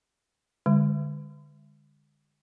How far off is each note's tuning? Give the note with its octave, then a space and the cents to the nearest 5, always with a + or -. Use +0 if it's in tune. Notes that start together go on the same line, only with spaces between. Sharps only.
D3 +0 G#3 -35